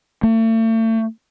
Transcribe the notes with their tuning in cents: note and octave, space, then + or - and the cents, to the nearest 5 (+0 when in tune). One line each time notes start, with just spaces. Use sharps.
A3 +40